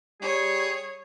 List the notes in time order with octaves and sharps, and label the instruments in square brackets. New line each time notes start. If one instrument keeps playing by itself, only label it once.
[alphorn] G3 [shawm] G#4 [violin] C#5